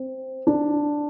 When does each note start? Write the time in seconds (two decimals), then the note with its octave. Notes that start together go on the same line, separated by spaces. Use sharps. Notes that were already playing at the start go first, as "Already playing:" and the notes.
Already playing: C4
0.47 D4